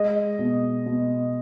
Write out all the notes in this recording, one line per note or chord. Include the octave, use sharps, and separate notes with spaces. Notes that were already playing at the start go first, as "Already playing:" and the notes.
Already playing: G#3 D#5
B2
B2